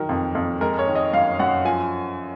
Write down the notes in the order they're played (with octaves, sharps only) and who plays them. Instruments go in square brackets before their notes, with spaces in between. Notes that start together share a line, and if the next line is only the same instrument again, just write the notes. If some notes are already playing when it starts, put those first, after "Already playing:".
Already playing: [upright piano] D#3 F#3 A#4
F2
F2
G#3 A#4
C#5
D#3
D#5
F#2 F5
F#2 F#5
F3 G#5